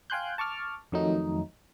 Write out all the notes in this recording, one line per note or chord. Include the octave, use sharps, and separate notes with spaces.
F5 G5 G#5 C6 F#6 G6
A5 C#6 D6 F6
F2 D#3 F#3 A3 D#4